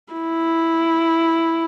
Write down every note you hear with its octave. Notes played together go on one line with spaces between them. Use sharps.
E4